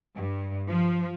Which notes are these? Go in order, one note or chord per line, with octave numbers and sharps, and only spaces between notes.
G2
F3